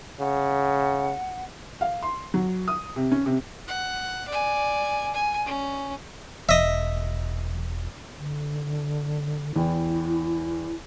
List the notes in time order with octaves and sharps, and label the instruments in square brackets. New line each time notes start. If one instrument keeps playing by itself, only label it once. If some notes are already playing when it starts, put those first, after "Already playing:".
[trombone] C#3 [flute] F#5
[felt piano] F5
C6
F#3
D#6
C3
C#4
C3
[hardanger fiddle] F#5
D5 G#5
G#5
C#4
[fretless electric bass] E1 [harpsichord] D#5 E5
[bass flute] D3
[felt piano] E2 G5 [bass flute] E4